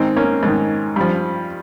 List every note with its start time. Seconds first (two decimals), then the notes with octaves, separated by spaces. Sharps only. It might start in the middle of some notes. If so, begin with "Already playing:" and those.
Already playing: G#2 D#3 C4 D#4
0.16 A#3 C#4
0.43 G#2 D#3
0.96 G2 F3